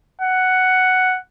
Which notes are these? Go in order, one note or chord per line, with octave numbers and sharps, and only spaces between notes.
F#5